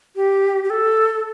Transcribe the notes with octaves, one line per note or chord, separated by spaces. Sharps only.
G4
G4
A4